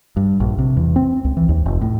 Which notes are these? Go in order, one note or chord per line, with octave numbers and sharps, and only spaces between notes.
G2
A#1
C3
E2
C4
C#2
E3
D#2
F1
A2